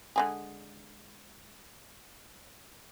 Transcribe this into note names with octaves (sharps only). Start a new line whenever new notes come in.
D3 G#3 G#4